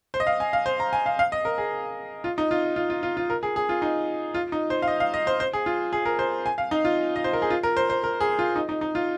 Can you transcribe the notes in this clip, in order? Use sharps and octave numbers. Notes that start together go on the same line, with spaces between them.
C5
D#5
F5
G#5
F5
C5
A#5
G#5
F5
F5
D#5
A#4
G#4
F4
D#4
F4
F4
F4
F4
F4
A#4
G#4
G#4
F4
D#4
F4
D#4
C5
F5
D#5
F5
D#5
C5
C5
G#4
F4
G#4
A#4
C5
G#5
F5
D#4
F4
D#5
C5
A#4
G#4
F4
A#4
C5
C5
A#4
G#4
F4
D#4
D#4
D#4
F4